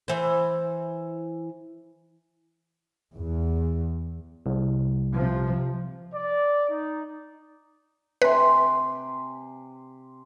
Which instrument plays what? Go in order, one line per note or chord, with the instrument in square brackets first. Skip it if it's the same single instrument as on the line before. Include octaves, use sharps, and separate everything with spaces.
[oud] E3 C5
[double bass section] E2
[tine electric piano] C2
[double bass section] C3 F3
[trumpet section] D5
D#4
[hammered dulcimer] C3 G#5 C6 [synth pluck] B4